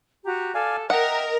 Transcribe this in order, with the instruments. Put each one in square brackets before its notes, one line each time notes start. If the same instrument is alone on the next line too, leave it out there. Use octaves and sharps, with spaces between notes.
[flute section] F#4 G4 A#5
[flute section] A4 [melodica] D5 F5 G#5
[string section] A#4 [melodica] D#5 [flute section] E5 G5 [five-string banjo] F#5